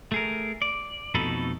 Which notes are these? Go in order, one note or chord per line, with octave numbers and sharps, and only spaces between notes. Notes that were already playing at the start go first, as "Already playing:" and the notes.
A3 G#4 A#4
D5
F2 B2 A3 D#4 A4 B5